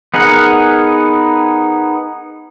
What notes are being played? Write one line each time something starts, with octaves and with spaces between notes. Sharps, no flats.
B3 D#4 G#4 A#4 F#5